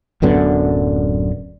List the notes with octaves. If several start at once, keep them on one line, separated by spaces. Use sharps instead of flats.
D1 F#2 D3 B3